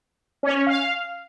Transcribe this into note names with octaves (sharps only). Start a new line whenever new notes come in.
C#4
C#4
F5